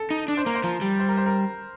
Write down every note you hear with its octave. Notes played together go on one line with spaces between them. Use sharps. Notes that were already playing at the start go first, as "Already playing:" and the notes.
Already playing: A4
D#4
D4
C5
A#3 A#4
C5
F3 A#4
G3
C5
A#4
C5
A#4